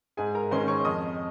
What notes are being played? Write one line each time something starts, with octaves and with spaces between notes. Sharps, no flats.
G#2 G#4 G#5
A#4 A#5
D#3 G#3 C#4 C5 C6
C#5 C#6
F2 D#5 D#6